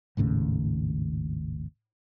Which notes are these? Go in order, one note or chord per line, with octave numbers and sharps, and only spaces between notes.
G#1 D#2 A2 C#3